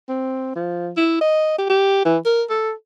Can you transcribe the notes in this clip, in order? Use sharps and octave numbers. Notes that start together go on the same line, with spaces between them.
C4
F3
E4
D#5
G4
G4
E3
A#4
A4